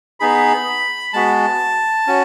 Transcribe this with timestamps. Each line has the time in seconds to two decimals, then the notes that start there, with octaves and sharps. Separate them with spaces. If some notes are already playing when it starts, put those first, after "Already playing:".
0.20 B3 D#4 G#4 B5
1.13 G#3 B3 F#4 A5
2.07 C#4 F#4